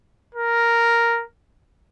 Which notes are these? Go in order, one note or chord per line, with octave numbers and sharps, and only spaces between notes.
A#4